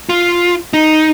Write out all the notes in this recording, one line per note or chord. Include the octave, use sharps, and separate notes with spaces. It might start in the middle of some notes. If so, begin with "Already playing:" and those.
F4
D#4